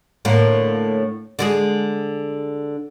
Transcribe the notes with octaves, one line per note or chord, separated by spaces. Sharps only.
A2 D3 A#3
D3 G#3 G#4